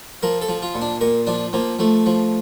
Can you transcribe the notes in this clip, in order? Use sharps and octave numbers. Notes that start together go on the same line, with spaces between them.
F3 A#4
A4
F3
F4
A#2
D4
A#2 A#4
F3 D4
F3 A#3
F3 A3
F3